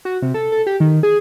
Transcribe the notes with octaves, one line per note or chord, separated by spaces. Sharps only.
F#4
C3
A4
A4
G4
D#3
G#4